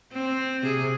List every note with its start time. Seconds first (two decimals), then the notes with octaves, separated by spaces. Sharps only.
0.13 C4
0.63 C3 G#4